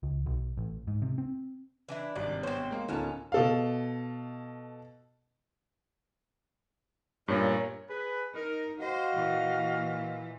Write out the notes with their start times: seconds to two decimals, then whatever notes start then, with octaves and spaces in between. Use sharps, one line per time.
0.03 C#2
0.26 B1
0.57 A1
0.87 G#2
1.02 C3
1.18 C4
1.89 E3 D4 E4
2.16 G#1 G2 C3 D5
2.43 B3 C4 C5 C#5
2.71 G#3 A#3
2.88 D1 B3 C#4 D#4 F4 A4 A#4 A5
3.32 B2 A4 F5
7.28 G2 A#2 A#4 C#5
7.88 G#4 B4
8.34 D#4 A#4
8.78 F#4 C5 D#5 F5
9.16 A#2 E3